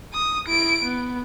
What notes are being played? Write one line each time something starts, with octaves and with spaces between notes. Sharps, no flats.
D#6
E4 D7
B3